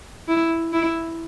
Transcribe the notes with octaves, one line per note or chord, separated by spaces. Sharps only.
E4
E4